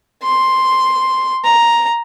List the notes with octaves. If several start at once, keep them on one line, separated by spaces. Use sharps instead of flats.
C6
A#5